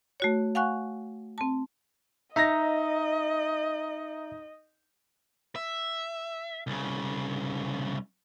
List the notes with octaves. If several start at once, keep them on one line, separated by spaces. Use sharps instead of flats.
A3 F#4 C#5
F5 F#5 G#5 C#6 F#6
C4 A5
D#4 D#5 E5 A#5 A#6
E5
C2 C#3